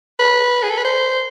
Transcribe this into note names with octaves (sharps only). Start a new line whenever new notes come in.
B4
G#4
A4
B4
C5